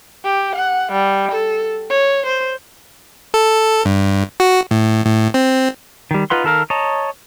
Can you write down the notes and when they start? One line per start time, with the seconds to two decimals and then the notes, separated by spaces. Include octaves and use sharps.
0.24 G4
0.56 F#5
0.92 G3
1.32 A4
1.90 C#5
2.26 C5
3.34 A4
3.85 G2
4.40 F#4
4.71 A2
5.05 A2
5.34 C4
6.11 D#3 G3
6.30 D#4 F4 B4 F#5 C6
6.44 D#3 A4 A#4 F5
6.70 C#5 D#5 A5 A#5